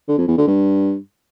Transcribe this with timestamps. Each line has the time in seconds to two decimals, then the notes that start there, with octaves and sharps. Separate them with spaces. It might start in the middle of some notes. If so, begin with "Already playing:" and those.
0.08 D3
0.18 F2
0.28 E2
0.37 D3
0.47 G2